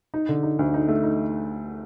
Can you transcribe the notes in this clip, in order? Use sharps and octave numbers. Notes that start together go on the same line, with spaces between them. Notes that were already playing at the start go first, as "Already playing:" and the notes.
D#4
D3
D#4
D2
D#4
A3
D#4